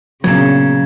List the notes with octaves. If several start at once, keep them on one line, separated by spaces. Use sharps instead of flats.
A#2 C#3 E3 F#3 B3 D4 A#5 G#6